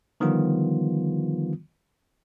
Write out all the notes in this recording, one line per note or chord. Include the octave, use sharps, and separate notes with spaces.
D3 D#3 F3 G3 B3 F4